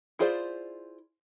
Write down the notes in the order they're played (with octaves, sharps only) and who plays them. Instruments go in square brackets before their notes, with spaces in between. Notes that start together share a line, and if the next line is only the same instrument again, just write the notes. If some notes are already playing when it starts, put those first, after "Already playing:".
[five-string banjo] E4 F4 G#4 C5 D5